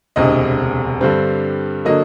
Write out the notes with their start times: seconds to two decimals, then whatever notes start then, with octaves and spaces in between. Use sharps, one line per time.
0.16 E1 D2 C3 D#5
1.01 G2 D3 G3 C4
1.85 D3 F#3 A#3 D#5